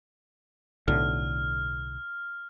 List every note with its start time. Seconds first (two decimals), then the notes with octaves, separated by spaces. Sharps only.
0.88 B1 A2 D3 F6